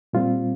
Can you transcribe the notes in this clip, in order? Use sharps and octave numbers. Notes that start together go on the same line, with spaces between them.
A#2 G3 C4 F4